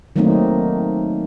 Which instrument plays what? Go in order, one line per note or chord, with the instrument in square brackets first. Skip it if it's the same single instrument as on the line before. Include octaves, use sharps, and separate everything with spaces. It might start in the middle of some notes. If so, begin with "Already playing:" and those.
[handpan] D#3 F#3 A3 A#3 C4 D#4